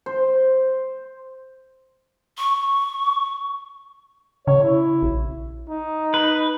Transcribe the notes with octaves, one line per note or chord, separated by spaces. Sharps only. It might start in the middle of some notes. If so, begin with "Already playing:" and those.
C5
C#6
C#3 C#5
E4
A#1
D#4
B4